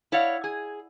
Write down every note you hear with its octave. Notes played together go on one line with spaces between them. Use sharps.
E4 C#5 D5 F5 F#5
G#4